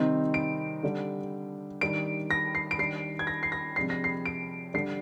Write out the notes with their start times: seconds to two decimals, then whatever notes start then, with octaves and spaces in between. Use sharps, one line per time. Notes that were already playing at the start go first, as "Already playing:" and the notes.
Already playing: C3 D#3 G3 C4 D#4
0.34 D7
0.83 D3 G3 D4
1.81 D#3 G3 D4 D7
2.31 A#6
2.55 C7
2.71 D7
2.78 D#3 G3 D4 C7
3.19 G#6
3.27 A#6
3.43 C7
3.52 A#6
3.76 C3 F3 G#3 D4 C7
3.90 A#6
4.04 C7
4.26 D7
4.74 D3 G3 D4 C7